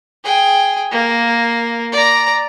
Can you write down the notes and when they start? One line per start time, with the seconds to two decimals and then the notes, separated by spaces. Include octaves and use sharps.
0.24 G#4 G5
0.91 A#3
1.92 D5 A#5